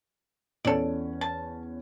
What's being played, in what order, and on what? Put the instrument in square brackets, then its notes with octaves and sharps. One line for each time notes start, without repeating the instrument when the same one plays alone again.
[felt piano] E2 C#4 [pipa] A4 D5
[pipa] A5